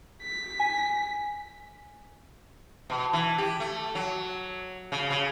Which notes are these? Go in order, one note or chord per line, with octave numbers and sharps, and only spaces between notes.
B6
G#5
B2
E3
G4
A3
F#3
C#3
C#3